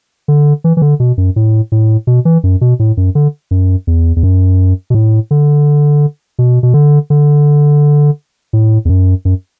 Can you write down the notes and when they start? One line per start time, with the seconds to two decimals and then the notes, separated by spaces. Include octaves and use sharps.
0.28 D3
0.64 E3
0.77 E3
0.82 D3
1.00 B2
1.18 F#2
1.36 A2
1.72 A2
2.07 B2
2.25 E3
2.44 F#2
2.61 B2
2.79 A2
2.97 F#2
3.15 D3
3.51 F#2
3.87 E2
4.16 E2
4.23 F#2
4.90 B2
4.94 A2
5.31 D3
6.39 B2
6.63 B2
6.74 D3
7.10 D3
8.53 A2
8.85 E2
8.89 F#2
9.25 F#2